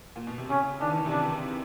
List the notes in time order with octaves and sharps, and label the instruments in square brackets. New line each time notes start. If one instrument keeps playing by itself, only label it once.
[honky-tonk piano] A#2
B2
C3
[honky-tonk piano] C#3 [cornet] C#4
[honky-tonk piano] D#3 [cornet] D4
[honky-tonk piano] E3
D#3
C3
[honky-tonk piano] C#3 [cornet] D4